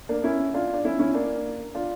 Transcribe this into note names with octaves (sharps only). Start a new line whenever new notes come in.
A#3 D4
C#4 E4
D4 F4
D4
C#4 E4
C#4 E4
A#3 D4
D4 F4